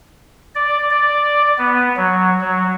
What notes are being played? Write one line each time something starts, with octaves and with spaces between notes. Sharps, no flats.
D5
D5
B3
F#3
F#3